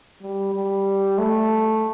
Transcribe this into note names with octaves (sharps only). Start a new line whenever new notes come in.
G3
G3
A3